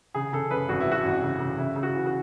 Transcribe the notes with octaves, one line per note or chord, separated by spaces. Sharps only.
C#3 G#4
C#3 A4
F#2 B4
G#1 F#4
E4
F#2 F#4
G#1
C#3
C#3
C#3 E4
C#3
F#4
E3
F#4